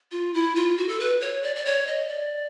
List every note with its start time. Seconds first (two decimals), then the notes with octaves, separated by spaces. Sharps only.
0.12 F4
0.34 E4
0.55 F4
0.77 F#4
0.88 A4
1.00 B4
1.21 C#5
1.43 D5
1.56 D5
1.65 C#5
1.87 D#5
2.08 D5